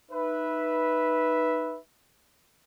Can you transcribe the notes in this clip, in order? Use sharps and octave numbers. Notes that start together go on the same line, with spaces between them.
D#4 B4 E5